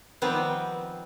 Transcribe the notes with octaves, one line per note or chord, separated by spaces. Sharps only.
D#3 F3 G3 B3 C4